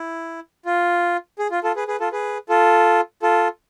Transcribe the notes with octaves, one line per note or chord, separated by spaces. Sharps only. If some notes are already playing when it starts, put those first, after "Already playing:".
Already playing: E4
F4
G#4
F4
F4 A4
G#4 B4
G#4 B4
F4 A4
G#4 B4
F4 A4
F4 A4